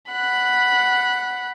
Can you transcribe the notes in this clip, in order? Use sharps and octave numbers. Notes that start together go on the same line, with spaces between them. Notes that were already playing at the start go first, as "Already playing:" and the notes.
F#5 B5 F#6